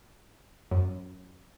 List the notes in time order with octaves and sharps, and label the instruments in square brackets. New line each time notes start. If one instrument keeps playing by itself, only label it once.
[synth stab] F#2